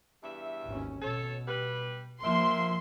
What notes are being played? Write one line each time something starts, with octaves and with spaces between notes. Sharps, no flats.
E2 G2 E5
G#1 D#2 C#4
B2 A4 C#5
G3 G4 B4
G2 F3 A#3 A#4 E5 C6